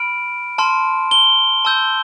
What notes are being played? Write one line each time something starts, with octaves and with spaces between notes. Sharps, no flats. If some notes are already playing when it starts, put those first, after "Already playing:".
Already playing: B5 F6 D7
A5 C6 F6
G7
A5 E6 G6